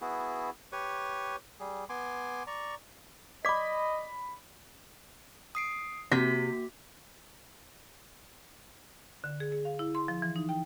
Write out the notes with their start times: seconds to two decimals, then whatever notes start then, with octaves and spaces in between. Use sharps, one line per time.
0.01 B3 E4 F#4 G#4
0.72 G4 B4 C#5 C#6
1.60 G3 G#4
1.89 B3 G#5 C6 D6
2.47 D5 A#5 C#6
3.45 D5 D#5 B5 D6 B6
5.55 D#6 C7 D7
6.11 C3 A#3 F#4 B6
9.24 D3
9.40 G#4
9.52 G#4
9.65 F5
9.79 E4
9.95 C6
10.08 F3
10.22 E3
10.36 D#4
10.49 G5